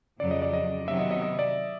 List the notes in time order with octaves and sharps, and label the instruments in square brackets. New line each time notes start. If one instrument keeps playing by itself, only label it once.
[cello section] F2 C#3 F#3 [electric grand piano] D5
[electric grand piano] D#5
D5
D#5
[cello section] C3 D#3 F#3 B3 [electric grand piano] E5
[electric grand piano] D#5
D#5
D#5
D5